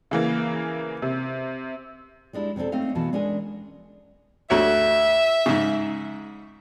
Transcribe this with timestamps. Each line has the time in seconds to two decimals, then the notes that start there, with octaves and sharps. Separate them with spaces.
0.11 C#3 E3 A#3
1.02 C3
2.33 G3 G#3 D4 E4
2.56 C3 B3 C4 D4 A4
2.72 A3 C4 C#4 D#4 D#5 F5
2.95 B2 E3 F#4 F5 A5
3.13 G#3 C#4 D4 G#4 A#4 G#5
4.50 D2 F#4 C#5 E5
5.46 G#2 C#3